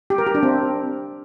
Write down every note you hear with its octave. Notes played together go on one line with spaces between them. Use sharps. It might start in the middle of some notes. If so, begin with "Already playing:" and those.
G4
A#4
G4
D4
C4